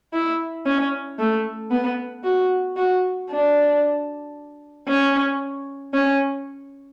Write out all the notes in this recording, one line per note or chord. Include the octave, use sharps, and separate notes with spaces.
E4
C#4
A3
B3
F#4
F#4
D4
C#4
C#4